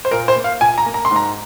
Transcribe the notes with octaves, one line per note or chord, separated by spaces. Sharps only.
C5
A#2 A#4
C5
A#3
F5
A#2 G#5
A#5
A#3
A#5
C6
G#2
A#5